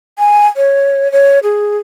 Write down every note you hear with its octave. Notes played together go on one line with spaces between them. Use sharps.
G#5
C#5
C#5
G#4